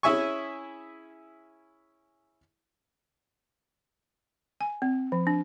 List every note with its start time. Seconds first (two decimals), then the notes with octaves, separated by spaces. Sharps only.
0.03 C#4 E4 G#4 E5 G#5 C#6
4.61 G#5
4.82 C4
5.12 F3
5.27 D4